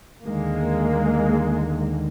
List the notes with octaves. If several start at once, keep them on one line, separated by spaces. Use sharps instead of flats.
D#2 D3 D#3 G#3 A#3